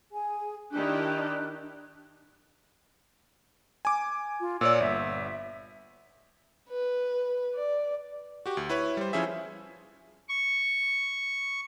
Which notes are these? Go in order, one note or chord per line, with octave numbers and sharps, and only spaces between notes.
G#4 G#5
D#3 D4 E4 G4 F#6
G#5 D6
F4
A#2 C#5 D5 E6
G1 E5
B4
D5
F#4 G4
D2
E4 B4 C#5
G3 C5
F3 C#4 E4 G#4 E5
C#6